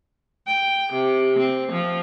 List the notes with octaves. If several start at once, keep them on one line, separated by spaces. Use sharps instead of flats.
G5
C3
C4
F3